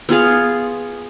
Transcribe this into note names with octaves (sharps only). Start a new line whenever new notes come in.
B3 F4 G#4 F5